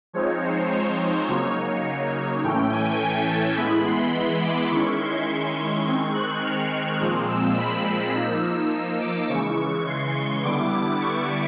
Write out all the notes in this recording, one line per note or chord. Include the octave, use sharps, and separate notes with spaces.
F3 G#3 C4 D#4 C#5
C5
C#5
C#5
C#3 F#3 A#3 D#4 C#5
C#5
A2 E3 A3 C#4 G5
G#5
A5
E3 G#3 B3 E4 B5
C6
D6
D#3 G#3 C#4 E4 C#6
C6
C#6
D#3 G#3 C4
F#6
F6
A#2 F3 G#3 C4
E6
B5
F3 A#3 D#4 E6
D6
C#3 E3 G#3 C#6
C6
C#6
D3 G3 B3 E4 D6
C#6